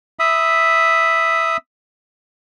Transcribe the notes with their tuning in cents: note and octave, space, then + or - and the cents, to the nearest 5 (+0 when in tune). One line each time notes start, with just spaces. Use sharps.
E5 +0 B5 +0 D#6 +0